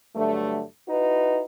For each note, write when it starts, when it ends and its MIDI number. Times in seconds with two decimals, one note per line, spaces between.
0.15 0.62 43
0.15 0.62 50
0.15 0.62 54
0.15 0.62 57
0.88 1.42 63
0.88 1.42 64
0.88 1.42 66
0.88 1.42 71